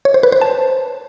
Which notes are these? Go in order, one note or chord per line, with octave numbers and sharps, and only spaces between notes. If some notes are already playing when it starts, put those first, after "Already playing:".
C#5
C5
B4
C5
A5